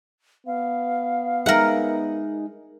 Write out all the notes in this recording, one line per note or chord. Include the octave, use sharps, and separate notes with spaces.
B3 F5
G#3 D#4 A#4 E5 F#5